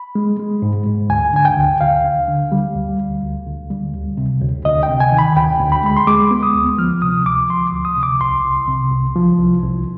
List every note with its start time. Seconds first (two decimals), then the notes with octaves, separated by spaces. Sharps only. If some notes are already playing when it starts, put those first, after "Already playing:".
Already playing: B5
0.15 G#3
0.39 G#3
0.62 G#2
0.86 G#2
1.10 D2 G#5
1.33 D3 G#5
1.45 G5
1.58 D2
1.81 D2 F5
2.05 D3
2.28 D3
2.52 G3
2.75 D2
3.00 D2
3.23 D2
3.47 D3
3.70 G3
3.94 D2
4.17 C3
4.41 D2
4.65 D2 D#5
4.83 G5
4.89 C3
5.00 G#5
5.12 D#3
5.19 B5
5.36 D2 G5
5.60 D2
5.72 B5
5.84 G#3 B5
5.97 C6
6.07 G#3 D6
6.31 B3
6.43 D#6
6.55 D2
6.78 F3 F6
7.02 C3 D#6
7.26 D2 D6
7.50 F3 C6
7.67 D6
7.73 D2
7.85 D#6
7.97 C3
8.03 D6
8.21 C2 C6
8.45 C2
8.68 C3
8.91 C2
9.16 F3
9.39 C2
9.63 C2